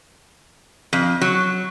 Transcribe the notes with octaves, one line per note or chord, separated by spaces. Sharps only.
F2
F#3